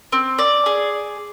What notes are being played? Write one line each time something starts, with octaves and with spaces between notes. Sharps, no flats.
C4
D5
G#4